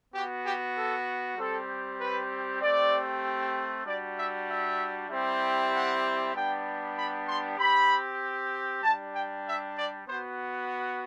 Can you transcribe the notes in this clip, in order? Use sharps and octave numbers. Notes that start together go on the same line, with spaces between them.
B3 F#4 G4
G4
A4
G3 C4 G4 A4
B4
A3 C4 G4 D5
G3 D4 F#4 D5
E5
E5
G3 C4 E4 G4
F#5
G3 B3 D4 G4 G5
B5
C6
C4 G4 B5
G3 D4 G4 A5
G5
E5
D5
B3 F#4 C5